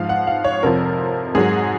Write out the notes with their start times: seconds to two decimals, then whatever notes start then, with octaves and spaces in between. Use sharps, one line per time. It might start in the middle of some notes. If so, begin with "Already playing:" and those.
Already playing: G#2 F3 F5
0.09 F#5
0.27 F5
0.44 C#5
0.63 F2 C3 F3 A#4
1.35 G#2 F#3 G#4